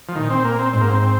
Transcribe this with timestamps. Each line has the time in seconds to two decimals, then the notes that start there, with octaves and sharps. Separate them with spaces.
0.09 F3
0.16 A#2 D#3
0.30 C4
0.45 A#3
0.59 C4
0.73 G#2 C4
0.81 A#3
0.89 C4
1.02 C4